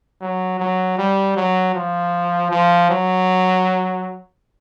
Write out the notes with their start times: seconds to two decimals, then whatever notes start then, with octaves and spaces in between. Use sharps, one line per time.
0.21 F#3
0.60 F#3
0.98 G3
1.37 F#3
1.75 F3
2.51 F3
2.90 F#3